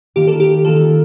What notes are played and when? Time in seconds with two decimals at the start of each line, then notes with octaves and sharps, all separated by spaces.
0.16 D#3 A#3 F4 G4
0.28 A4
0.40 G4
0.64 D#3 A#3 F4 A4